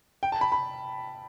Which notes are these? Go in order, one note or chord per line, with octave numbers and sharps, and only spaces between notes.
G5
A5
B5
B5